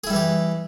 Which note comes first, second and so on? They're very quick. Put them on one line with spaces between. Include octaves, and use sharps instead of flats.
G#4 E4 G3 E3 G4